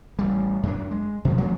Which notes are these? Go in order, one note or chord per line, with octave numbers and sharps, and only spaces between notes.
A1 G3
F#2 F#3 D4
G#3
B2 F3 G#3
F3 G#3 A#3 C#4